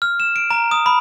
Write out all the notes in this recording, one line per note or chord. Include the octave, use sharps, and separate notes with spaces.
F6
E7
D7
A#5
D#6
B5